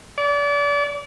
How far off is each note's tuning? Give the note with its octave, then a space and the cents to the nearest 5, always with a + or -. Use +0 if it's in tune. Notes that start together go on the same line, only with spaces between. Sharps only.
D5 -35